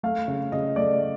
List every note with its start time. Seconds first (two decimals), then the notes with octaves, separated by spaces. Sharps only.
0.03 A3 F5
0.28 C#3
0.52 C#3 D#5
0.76 A3 D5